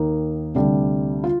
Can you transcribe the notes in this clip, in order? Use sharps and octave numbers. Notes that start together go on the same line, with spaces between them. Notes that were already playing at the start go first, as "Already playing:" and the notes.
Already playing: D#2 D#3 A#3 D#4
D2 C3 G3 D4
F4